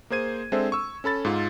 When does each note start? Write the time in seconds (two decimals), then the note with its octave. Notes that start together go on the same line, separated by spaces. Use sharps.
0.10 A#3 G#4 C5 G#6 D#7
0.52 G#3 C4 D4 A4 C5 E5
0.72 C#6 E6
1.04 C#4 A4 B5 A6
1.25 G#2 F4